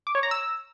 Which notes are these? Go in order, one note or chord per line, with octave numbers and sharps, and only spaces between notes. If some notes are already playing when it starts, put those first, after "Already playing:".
D6
C#5
A#5
E6